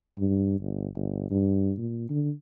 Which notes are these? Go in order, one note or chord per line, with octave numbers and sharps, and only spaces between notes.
G2
G1
G1
G2
A#2
D3